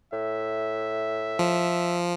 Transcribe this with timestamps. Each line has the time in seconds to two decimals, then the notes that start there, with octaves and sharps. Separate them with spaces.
0.13 A2 E5
1.39 F3